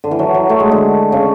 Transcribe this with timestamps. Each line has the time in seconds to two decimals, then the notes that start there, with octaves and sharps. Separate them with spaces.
0.04 D3
0.11 E3
0.19 F#3
0.34 F#3
0.49 A3
0.60 G#3
0.72 D3
1.12 C#3